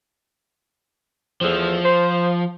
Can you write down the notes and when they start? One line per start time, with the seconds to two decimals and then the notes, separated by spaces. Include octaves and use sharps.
1.41 E2 F3 A3 C5
1.83 C5